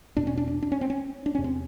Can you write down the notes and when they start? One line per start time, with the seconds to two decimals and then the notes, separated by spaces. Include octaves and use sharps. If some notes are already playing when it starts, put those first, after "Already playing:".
0.17 E2 B2 D4
0.27 C#4
0.37 D4
0.48 D4
0.62 D4
0.72 C#4
0.81 C4
0.90 C#4
1.26 D4
1.35 E2 C3 C#4
1.44 C4